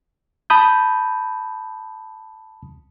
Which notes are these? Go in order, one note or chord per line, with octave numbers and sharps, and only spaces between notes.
A5 B5 D#6 G6